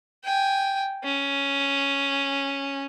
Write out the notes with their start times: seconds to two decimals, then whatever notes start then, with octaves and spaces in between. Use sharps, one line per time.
0.24 G5 G#5
1.04 C#4